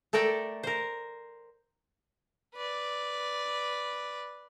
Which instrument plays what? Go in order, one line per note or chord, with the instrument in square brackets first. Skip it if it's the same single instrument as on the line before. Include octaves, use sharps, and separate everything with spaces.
[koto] A3 A4 A#4 D5 G5
A#4 C5
[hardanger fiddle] B4 D5